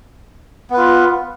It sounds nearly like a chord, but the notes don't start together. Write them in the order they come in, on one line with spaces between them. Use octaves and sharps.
B3 B4 F4